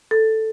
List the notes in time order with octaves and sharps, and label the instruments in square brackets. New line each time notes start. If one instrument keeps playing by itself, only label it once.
[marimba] A4